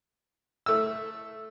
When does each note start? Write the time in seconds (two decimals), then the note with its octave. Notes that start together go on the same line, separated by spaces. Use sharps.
0.66 A3 E6